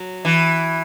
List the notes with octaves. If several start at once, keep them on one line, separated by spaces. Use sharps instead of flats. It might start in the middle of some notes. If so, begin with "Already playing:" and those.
Already playing: F#3
E3